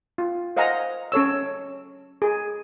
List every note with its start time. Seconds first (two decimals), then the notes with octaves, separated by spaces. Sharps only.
0.18 F4
0.56 C5 D#5 F5 F#5 G#5 A#5
1.12 C#4 A4 C#5 E6
2.22 G#4